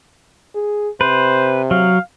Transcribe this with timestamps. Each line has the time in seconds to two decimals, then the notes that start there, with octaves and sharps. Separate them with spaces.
0.55 G#4
1.01 C3 B4 C5
1.71 F#3 F5